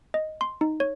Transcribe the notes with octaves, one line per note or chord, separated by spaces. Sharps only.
D#5
C6
D#4
C#5